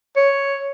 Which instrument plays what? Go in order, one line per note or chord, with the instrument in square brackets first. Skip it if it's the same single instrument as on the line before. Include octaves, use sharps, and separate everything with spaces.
[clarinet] C#5